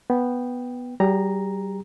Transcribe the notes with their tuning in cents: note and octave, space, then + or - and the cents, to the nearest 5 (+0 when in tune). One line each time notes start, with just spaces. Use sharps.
B3 +0 G5 +0
G3 -35 G4 +45 A#5 +0